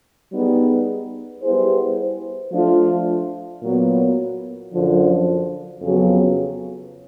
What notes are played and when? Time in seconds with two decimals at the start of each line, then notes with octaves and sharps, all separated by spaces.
0.33 G3 B3 D#4 G#4 B4
1.42 G3 B3 E4 G#4 C5
2.52 F3 A3 D4 F4
3.62 A#2 F#3 B3
4.73 F#2 D3 F3
5.82 F2 C#3 F#3 B3